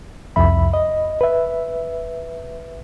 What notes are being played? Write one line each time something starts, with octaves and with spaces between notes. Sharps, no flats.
C2 F2 E5 B5
D#5
B4 E5